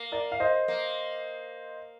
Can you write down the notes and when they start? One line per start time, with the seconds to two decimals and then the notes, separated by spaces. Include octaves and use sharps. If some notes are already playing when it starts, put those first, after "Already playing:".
Already playing: A#3
0.12 A#4 D5
0.32 F5
0.40 C5 D#5
0.68 A#3